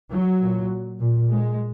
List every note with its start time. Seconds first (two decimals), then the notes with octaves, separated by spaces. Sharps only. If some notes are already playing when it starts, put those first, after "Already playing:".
0.10 F#3
0.40 A#2
0.99 A#2
1.28 G#3